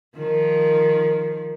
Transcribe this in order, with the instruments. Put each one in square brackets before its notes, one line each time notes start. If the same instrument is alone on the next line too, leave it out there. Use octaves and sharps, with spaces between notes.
[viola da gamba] D#3 F3